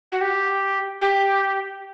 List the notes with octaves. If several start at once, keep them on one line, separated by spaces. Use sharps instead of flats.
F#4
G4
G4